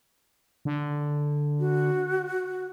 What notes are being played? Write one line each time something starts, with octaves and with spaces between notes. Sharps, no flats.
D3
F#4